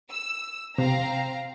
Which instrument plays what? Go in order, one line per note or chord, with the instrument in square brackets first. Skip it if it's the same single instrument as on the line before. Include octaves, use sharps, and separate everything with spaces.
[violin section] E6
[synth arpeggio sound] C3 [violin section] C4 F5 A#5